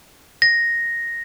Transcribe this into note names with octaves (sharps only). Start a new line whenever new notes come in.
A#6